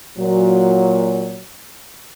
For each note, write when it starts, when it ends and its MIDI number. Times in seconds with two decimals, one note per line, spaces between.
0.19 1.41 46
0.19 1.41 54